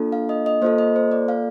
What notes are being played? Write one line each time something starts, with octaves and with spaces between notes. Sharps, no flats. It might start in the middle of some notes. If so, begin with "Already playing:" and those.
Already playing: A#3 D4 F4 A4
F5
D#5
D#5
A#3 F4 A4 C5
D#5
C5
D5
F5